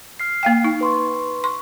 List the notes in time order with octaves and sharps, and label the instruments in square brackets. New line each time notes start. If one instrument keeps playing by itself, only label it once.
[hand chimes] F6 C7
[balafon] A#3 F5 G5
D#4
[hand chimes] B4 C6 C#6
[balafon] C6 [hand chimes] C#6